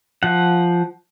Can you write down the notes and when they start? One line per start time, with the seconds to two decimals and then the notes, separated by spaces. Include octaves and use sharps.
0.23 F3 F#5